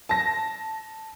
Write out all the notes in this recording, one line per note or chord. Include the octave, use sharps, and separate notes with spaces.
A5 A#6